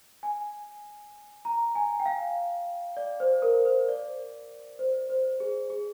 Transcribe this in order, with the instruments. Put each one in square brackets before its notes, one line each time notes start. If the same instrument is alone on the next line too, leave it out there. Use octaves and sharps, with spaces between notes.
[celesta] G#5
A#5
G#5
G5
F5
D5
C5
A#4
C5
D5
C5
C5
G#4
G#4